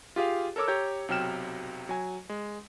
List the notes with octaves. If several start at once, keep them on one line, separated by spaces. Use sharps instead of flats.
F4 G4 G#4 F5
A4 A#4 C#5 D6 E6
G4 C#5 A#5 G6
B1 C3 F#3 G5 F6 E7
F#3 G#5
G#3